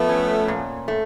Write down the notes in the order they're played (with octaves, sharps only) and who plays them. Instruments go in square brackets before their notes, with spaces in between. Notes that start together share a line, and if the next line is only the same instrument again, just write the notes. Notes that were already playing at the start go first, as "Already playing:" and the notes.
Already playing: [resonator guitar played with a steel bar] F3 [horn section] A3 B3
[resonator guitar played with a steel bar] C#4
A#2
A3